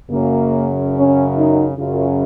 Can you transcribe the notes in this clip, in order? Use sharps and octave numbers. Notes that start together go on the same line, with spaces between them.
F#2 C#3 A#3
C#4
D#4
F#2 C#3 F4